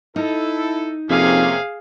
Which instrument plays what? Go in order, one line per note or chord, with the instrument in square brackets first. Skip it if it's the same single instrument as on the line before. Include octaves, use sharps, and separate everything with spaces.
[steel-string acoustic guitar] D#4 [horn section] E4 A4
[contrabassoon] F2 [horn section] C3 A#3 C#4 [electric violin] G#4 F5